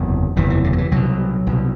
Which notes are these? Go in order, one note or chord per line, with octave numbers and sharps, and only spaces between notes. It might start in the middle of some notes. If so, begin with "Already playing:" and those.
Already playing: F#1 E2 C3
F#1 E2 C3 E3
E3
D3
F#3
E3
C2 B2 F#3
C2 B2